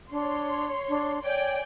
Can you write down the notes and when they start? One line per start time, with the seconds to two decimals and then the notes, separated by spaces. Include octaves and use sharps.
0.12 D4 C#5 C6
0.89 D4
1.24 C#5 D5 G5 G#5